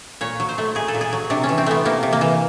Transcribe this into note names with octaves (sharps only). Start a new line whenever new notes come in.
A#2 C#5
F#3
C5
A3
A#2 G#4
A4
A#2
G#4
F#3
C3 D4
C#4
E3
C4
A3 B3
C3 A#3
C3
A#3
E3